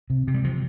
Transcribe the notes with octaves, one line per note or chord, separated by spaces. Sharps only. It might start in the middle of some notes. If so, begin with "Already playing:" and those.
C3
C3
G3
C3 F3